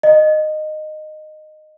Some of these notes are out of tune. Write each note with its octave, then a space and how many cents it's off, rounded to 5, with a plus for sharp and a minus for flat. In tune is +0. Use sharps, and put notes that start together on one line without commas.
D#5 -15